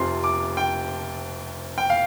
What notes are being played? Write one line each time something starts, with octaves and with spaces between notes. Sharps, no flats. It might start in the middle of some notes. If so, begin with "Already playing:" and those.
Already playing: F1 F2 C3 C6
D6
G5
G5
F5